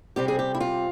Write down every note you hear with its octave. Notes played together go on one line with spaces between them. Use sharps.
C3 G3 C4 G4
G#4
G4
E4
F4